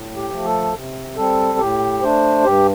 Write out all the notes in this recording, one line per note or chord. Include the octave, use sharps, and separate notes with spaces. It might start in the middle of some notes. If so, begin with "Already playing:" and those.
Already playing: A2
G4
F3 A3
A4
C3
G3 C4 A4
A2 G4
A3 D4 C5
G2 G4